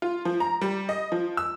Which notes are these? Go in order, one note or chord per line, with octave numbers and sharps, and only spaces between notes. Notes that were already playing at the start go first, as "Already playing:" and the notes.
F4
F3
A#5
G3
D#5
F3
E6